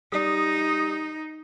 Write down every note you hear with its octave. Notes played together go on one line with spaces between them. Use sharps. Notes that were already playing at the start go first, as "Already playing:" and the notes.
G3 D#4 D5 D#6